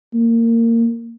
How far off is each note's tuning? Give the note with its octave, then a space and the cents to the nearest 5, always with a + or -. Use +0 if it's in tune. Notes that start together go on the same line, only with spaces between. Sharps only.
A#3 -20